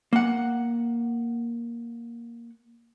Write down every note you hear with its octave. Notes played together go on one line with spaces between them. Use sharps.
A#3 F#5